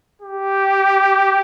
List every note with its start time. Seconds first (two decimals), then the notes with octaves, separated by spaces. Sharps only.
0.22 G4